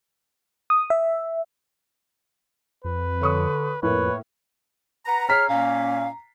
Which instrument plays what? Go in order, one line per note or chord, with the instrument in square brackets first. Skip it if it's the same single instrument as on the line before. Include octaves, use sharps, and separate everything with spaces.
[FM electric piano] D#6
E5
[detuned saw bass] F2 [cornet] B4
[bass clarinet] D3 [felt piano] C#5 C#6 D#6
[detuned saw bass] F2 [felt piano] A2 A#3 [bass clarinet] B4 [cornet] C#5
[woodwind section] B4 F#5 A#5
[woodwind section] G#4 C#5 [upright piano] A#5 B6 C7 [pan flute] F6
[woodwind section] A#2 A#3 C#4 [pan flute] F5